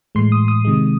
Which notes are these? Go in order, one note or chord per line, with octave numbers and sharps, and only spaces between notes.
A2 E3 G#3 C6
D#6
D#6
C3 D#3 G#3